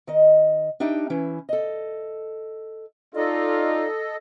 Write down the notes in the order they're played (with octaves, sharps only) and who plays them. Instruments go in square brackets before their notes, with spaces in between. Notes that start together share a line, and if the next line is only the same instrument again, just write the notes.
[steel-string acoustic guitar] D#3 D#5
D4 D#4 G4 E5 G5
E3 C#4 E4
A4 D#5
[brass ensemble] D#4 F4 [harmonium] A4 D#5 [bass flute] D5